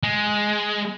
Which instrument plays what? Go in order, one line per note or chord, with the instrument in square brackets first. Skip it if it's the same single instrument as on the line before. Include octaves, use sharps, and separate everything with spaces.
[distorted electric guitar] G#3